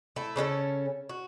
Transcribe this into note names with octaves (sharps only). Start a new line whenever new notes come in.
A3 E4
C#3 C#4 D4 A4
F#4